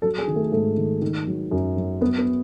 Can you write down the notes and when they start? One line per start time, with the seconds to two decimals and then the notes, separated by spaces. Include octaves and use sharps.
0.02 F#3 A4
0.18 G#4
0.27 D#3
0.36 A3
0.52 G#2 A3
0.77 D#3
1.02 D#3
1.27 F#3
1.51 F#2
1.77 F#3
2.01 F#2 B3
2.18 B3